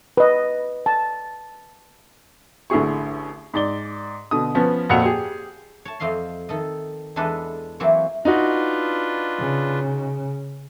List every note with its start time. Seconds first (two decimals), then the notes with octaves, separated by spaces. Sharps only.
0.17 B4 D#5
0.86 A5
2.70 A1 D3 E4 G#4 C#6
3.54 G#2 D5 G7
4.31 B2 D3 D#6
4.55 F3 B3 C#4
4.89 F2 A#2 C4 F#5 C#7 F7
5.05 G4 G#4
5.85 C#5 A5
6.00 F2 C4 D#5 F5 C6
6.49 D#3 A4 D#5
7.16 E2 G#3 D4 A4 B4 D#5
7.80 E3 F#3 A#3 C4 C#5
8.25 D4 D#4 F4 F#4 B4
9.39 C#3